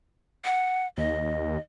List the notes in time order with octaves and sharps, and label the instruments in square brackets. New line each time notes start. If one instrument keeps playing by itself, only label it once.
[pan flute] F#5
[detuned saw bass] D#2 [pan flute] D#5